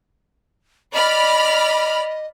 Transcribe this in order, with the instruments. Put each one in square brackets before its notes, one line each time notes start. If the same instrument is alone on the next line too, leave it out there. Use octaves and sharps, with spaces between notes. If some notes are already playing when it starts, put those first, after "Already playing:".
[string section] D5 B5 F6 [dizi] D#5